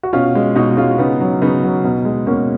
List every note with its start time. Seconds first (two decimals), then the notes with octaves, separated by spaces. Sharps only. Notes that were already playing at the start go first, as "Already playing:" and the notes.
0.03 F#4
0.13 B2 C#4 F4
0.35 G#3
0.55 B2 D#4 F#4
0.77 G#3 C#4 F4
0.98 C#3 B3 D#4
1.20 F#3
1.42 C#3 B3 D#4
1.63 F#3
1.84 B2
2.05 G#3
2.27 B2 A#3 C#4